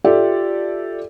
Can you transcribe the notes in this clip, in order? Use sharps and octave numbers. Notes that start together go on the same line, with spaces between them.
F4 G4 A4 D5 E5